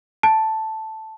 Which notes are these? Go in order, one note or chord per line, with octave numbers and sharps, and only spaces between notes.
A5